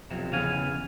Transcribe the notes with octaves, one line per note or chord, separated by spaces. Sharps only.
B1 F2 C3
E2 C#3 F5 G#5